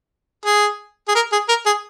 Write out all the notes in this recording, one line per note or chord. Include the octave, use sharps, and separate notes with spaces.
G#4
G#4
A#4
G#4
A#4
G#4